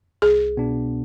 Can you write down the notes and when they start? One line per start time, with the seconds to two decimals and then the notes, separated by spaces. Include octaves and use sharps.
0.22 C2 G#4
0.57 B2 B3 D4